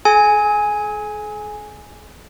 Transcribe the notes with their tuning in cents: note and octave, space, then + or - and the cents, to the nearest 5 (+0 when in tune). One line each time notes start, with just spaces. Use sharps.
G#4 +45 G#5 +0